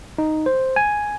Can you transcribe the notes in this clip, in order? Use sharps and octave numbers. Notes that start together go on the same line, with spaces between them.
D#4
C5
G#5